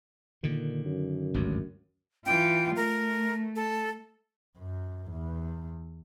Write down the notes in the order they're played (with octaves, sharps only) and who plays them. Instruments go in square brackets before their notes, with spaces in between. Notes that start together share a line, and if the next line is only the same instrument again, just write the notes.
[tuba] A#2 [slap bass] D3 D#3
[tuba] F#2
[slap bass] G#1 D2 G2
[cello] E3 F4 [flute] G5
[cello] A3 [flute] A#4
[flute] A4
[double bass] F#2
E2